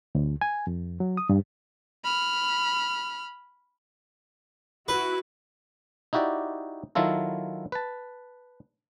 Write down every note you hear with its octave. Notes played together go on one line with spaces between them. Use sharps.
D2
G#5
F2
F#3
D#6
G2
B5 F6
E4 F#4 B4
D#4 E4 F#4 G4 D5
D#3 F#3 E4 F4 A4
B4 A5